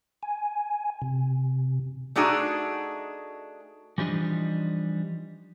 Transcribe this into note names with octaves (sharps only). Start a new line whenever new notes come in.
G#5
C3
A3 D4 D#4 F#4 G#4
E3 F3 G3 D4 D#4